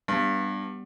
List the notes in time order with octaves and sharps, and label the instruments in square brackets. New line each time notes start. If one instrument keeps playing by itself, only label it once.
[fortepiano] G2 [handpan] G3 B3